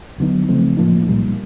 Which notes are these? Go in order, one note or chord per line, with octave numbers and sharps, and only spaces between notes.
D#2 D3 F#3 B3 D#4
C#3 F3 A3 C4
A2 F3 A#3 D#4
C2 A#2 G3 A#3